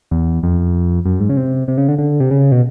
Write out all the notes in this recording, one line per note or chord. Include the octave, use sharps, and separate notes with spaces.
E2
F2
F#2
G#2
C#3
C3
C3
C#3
D3
D3
C3
C#3
B2